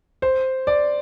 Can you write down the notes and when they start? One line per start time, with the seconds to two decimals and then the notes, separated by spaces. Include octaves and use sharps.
0.22 C5
0.67 D5